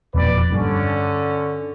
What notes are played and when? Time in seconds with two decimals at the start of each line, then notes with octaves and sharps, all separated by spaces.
0.15 E1 F2 A#2 B4 D5
0.53 G2 D3 C#4